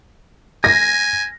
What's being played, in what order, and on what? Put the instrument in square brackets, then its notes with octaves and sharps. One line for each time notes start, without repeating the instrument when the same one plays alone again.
[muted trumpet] G#5 [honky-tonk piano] A#6